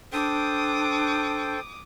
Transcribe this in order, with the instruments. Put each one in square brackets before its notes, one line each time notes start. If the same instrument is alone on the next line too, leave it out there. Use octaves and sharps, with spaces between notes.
[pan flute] D4 [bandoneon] A4 C5 G5 [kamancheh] D6 D#6